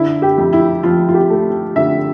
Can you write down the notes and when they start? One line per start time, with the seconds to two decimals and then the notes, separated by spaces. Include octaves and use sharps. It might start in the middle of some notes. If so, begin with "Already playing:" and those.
Already playing: D3 E4
0.22 G4
0.38 F2
0.53 E4
0.83 F3 F4
1.08 F4
1.14 G4
1.30 A3
1.76 D3 E5